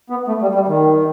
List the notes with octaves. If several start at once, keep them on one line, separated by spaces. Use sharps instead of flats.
B3
A3
G3
G3
D#3